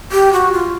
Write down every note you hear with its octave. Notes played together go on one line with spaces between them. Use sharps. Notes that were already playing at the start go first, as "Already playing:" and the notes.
G4
F#4
F4